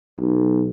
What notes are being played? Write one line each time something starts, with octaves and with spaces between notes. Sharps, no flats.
B1